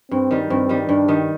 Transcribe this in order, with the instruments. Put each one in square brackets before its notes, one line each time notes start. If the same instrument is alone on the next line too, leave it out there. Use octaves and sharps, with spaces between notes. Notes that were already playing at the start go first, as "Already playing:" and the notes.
[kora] G2 [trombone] C4
[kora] D#3 G3
[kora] G2 [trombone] C4
[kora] D#3 G3
[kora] G2 [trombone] D4
[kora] D#3 G3